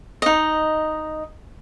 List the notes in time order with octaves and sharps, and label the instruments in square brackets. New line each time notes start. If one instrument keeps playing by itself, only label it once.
[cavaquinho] D#4 D#5